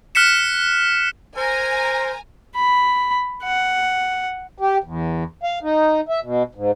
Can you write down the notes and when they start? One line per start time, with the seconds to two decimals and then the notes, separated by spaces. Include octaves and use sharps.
0.15 F6 F#6 B6 C#7 E7
1.37 A#4 C5 G#5 A#5
2.55 B5
3.44 F#5
4.58 G4
4.84 E2
5.43 F5
5.63 D#4
6.09 E5
6.23 B2
6.55 G#2